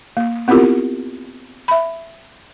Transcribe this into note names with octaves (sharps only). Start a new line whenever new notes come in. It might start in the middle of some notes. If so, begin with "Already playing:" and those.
A#3
B3 C4 E4 F4 G4 A#4
E5 B5